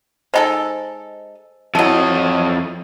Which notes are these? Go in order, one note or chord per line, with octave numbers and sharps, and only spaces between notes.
G#3 D#4 A4 C5 D#5 G#5
F2 F#3 A3 D#4 E4 D#5